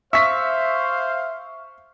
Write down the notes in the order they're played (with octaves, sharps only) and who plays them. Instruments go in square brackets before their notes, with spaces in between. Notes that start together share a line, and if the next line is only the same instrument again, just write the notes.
[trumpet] C5 [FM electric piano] E5 [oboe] F5 [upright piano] C#6 B6